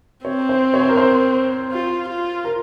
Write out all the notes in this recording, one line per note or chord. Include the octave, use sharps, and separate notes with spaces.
C4 C#5
C5
C#5
C5
A#4
C5
F4
F4
A#4